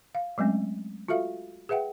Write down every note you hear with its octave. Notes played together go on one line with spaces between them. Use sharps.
F5
F#3 G#3 A3 C4 C#4
F4 F#4 A4 E5 F5
G#4 B4 E5 F#5 G5